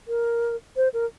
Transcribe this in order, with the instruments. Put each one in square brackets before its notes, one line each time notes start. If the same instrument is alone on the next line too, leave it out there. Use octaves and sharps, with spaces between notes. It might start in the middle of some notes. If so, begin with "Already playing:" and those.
[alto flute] A#4
C5
A#4